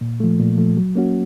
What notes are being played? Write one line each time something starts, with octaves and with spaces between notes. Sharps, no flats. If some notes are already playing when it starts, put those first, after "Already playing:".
A#2
F3 A3
A#2
F3 A3
F#3
A#3 C#4 F#4